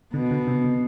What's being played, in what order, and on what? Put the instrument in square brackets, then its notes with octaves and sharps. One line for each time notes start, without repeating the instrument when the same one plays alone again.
[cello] B2 [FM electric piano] D3
[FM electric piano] D3
C3
D3